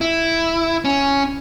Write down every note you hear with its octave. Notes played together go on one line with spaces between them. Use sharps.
E4
C#4